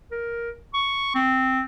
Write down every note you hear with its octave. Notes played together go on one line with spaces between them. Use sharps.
A#4
C#6
C4